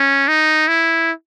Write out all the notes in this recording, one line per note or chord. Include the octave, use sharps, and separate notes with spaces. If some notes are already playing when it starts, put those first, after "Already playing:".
Already playing: C#4
D#4
E4